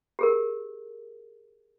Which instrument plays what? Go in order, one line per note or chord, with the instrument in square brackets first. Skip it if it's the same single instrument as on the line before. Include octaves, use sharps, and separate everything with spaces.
[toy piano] G4 G#4 A#4